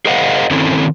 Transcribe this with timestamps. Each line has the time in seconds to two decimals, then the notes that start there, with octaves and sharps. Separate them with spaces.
0.06 G#4 A#4 C5 D#5 F5 F#5
0.51 D#3 C4 C#4 E4 A4 A#4